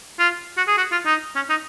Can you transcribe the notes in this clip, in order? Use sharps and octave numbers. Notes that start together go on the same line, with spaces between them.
F4
F#4
G#4
F#4
F4
D#4
C#4
D#4